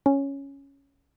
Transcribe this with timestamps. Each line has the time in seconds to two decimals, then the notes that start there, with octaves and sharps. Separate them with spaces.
0.06 C#4